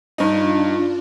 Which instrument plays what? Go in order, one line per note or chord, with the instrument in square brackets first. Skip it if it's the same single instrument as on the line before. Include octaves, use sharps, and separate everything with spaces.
[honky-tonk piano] G2 D#4 [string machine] D4 F4